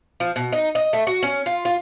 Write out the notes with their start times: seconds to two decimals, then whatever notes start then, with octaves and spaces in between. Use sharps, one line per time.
0.20 F3
0.36 B2
0.53 D#4
0.75 D#5
0.93 A3
1.07 F#4
1.23 C#4
1.46 F4
1.65 F4